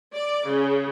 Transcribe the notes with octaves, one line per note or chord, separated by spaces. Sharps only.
D5
C#3